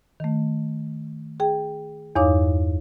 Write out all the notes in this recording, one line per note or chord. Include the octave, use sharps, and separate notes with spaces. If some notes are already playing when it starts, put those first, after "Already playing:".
D#3 A3
G#4 G5
E2 G2 D#4 C#5 F5 D6